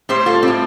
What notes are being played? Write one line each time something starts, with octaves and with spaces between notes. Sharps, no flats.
A2 G3 G4 C5
F4 A4
G3 C4
A2